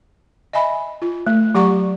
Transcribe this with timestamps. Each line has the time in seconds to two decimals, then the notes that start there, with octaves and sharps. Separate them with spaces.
0.53 D#5 E5 G#5 B5
1.02 F4
1.27 A3
1.55 F#3 G4 D5 F#5 A#5 C#6